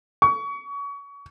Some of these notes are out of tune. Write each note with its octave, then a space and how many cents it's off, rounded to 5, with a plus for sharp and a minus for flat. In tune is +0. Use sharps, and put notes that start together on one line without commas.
C#6 +30